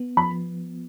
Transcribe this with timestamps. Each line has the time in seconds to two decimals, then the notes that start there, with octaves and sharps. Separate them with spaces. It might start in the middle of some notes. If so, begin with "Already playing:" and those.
Already playing: B3
0.17 F3 B5